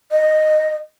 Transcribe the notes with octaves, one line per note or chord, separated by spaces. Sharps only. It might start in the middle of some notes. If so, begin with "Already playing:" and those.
D#5